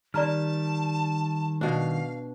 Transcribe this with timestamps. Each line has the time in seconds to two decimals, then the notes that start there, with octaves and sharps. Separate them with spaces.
0.14 D#3 G3 D5 A5 A#5 F6
1.61 B2 D4 F5